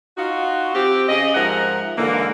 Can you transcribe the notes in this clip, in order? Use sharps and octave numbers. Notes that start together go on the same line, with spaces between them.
D#4 F4 F#4
C4 G4
C#3 G#4 D#5
G#2 F3 A#4 E5 F#5
G#2 D3 E3 A#3